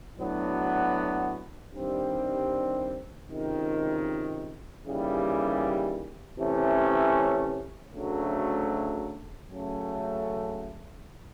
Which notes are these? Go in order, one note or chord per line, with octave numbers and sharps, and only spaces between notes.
A2 F#3 B3 D4 F#4
G2 D#3 G3 C4
C#2 C3 D#3
D#2 C#3 E3 G3
C3 E3 A3 C#4
D2 C#3 F#3 A3
C#3 F#3 A3 C#4